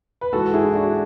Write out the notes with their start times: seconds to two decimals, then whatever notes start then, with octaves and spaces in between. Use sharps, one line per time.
0.21 B4
0.33 G#2 E3 F#4 A4
0.54 E4 G#4
0.65 E4
0.75 D4 F#4